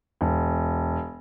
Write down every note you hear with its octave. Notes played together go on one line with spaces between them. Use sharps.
E1